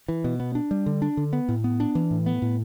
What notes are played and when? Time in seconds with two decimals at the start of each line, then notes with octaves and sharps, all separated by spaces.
0.08 E3
0.24 B2
0.40 B3
0.55 D4
0.71 G3
0.86 D3
1.02 D4
1.17 D3
1.33 B3
1.49 A2
1.64 B3
1.80 D4
1.95 E3
2.11 A2
2.26 B3
2.42 A2